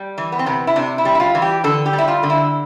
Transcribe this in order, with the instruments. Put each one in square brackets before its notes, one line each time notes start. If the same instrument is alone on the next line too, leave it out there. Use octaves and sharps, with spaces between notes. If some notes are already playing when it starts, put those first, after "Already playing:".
Already playing: [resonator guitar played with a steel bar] G3
E3
B3
C4
C3 B3
E4
C3 D4
E4
G3
E4
F4
E3
G4
D3 A4
G4
G3
E4
F4
D3
E4